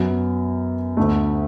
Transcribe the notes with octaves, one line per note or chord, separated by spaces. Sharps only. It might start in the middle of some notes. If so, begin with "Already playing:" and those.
Already playing: F#2 F#3 B3
D2 D3 A3